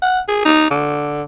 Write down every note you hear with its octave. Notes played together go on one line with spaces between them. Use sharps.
F#5
G#4
D#4
D3